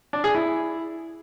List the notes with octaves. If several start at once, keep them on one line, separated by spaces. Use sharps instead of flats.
D4
G#4
E4